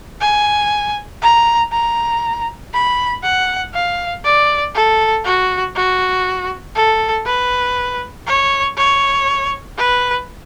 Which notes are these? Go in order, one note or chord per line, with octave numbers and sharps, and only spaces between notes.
G#5
A#5
A#5
B5
F#5
F5
D5
A4
F#4
F#4
A4
B4
C#5
C#5
B4